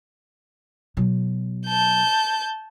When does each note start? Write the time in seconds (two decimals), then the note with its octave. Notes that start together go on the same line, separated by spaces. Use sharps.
0.97 B2 F#3
1.66 A5 G6